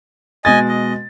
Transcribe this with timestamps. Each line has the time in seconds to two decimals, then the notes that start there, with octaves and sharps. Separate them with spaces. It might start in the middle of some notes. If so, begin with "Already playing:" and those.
0.45 B2 G#3 D#5 G#5 A6
0.68 D#5